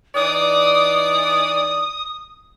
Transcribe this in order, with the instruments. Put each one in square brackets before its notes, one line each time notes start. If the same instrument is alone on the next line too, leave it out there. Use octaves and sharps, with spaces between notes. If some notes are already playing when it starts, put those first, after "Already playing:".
[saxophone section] E3 D#4 D5 [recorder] D#6